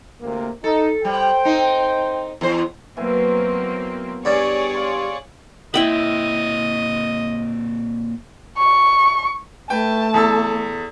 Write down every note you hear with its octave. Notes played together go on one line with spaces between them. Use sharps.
D2 C3 A#3
D#4 A4
G3 C5 G5
C4 D#4
E2 C5
B2 F#3 A#3 C4 E4 G#5
G2 G3 G#4 C#5 D5
F5 C6
A#2 C4 E4 D#5 G5 B5
C#6
A3 B4 G5 A5
E2 A4 E6